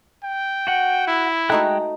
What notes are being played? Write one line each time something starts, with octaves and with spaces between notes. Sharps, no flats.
G5
F#4 F#5
E4
G#3 A3 D#4 F#4 G5 F#6